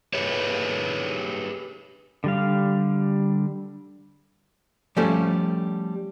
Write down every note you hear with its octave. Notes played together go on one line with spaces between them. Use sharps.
G4 G#4 B4 C#5
D3 G3 F5
F3 G3 A3 C#4 A4